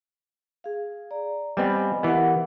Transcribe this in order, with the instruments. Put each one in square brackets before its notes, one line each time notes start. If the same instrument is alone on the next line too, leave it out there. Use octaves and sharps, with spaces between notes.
[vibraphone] G#4 F5
D5 A#5
[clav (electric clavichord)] G3 B3 C4 [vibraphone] D#5 G#5 B5
[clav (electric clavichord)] E3 B3 [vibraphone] G4 A#4 F#5